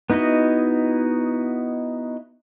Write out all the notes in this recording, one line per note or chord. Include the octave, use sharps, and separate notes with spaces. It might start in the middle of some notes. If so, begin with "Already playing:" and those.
B3 D#4 E4 F#4 D#5